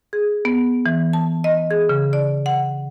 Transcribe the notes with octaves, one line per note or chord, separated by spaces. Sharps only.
G#4
B3
E3
A5
D#5
G#4
C#3
D5
F#5